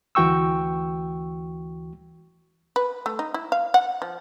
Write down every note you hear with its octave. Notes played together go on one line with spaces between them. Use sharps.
D2 E3 F#4 G5 C#6 E6
B4
A3
D#4
E4
F5
F#5
F3